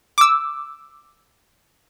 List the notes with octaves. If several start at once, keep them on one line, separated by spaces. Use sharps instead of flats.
D6 E6